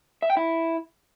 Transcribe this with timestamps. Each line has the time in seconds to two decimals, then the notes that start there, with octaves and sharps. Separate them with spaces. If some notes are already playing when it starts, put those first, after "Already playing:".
0.22 E5
0.30 G5
0.37 E4